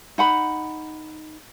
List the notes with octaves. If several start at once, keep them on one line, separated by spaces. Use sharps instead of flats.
D#4 F#5 B5